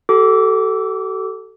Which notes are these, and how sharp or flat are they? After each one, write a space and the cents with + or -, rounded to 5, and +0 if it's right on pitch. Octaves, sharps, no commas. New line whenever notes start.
F#4 +45 A4 +0 D6 -20